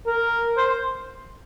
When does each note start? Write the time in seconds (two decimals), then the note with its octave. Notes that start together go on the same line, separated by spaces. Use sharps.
0.06 A#4
0.57 C5